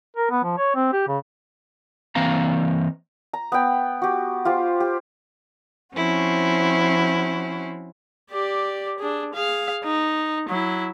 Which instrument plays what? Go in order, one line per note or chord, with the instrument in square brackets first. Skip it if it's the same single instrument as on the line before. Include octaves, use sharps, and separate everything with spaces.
[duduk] A#4
B3
F3
C#5
C4
G4
C#3
[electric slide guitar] E3 A#3 C4 F5 A#5
[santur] A#5
B3 G5
F#4 G4
F4 G4 C5
G4
[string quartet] F3 C4 C#4 E4 F#4
[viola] G4 D5
D4 G#4
G#4 F5
D#4
F#3 E4